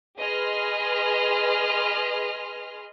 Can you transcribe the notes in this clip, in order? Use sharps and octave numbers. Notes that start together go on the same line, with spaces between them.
G#4 B4 D#5 C6 F6